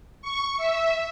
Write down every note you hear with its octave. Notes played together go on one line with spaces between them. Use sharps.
C#6
E5